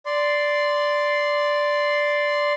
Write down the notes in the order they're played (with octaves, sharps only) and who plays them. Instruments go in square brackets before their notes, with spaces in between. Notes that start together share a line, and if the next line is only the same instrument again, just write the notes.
[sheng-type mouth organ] D5 C6